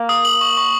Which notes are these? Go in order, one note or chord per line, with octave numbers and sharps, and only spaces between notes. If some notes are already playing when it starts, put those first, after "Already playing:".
Already playing: A#3
D#6
F#7
C#6
C#6